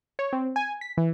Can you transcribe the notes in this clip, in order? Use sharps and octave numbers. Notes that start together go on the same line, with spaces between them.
C#5
C4
G#5
B6
E3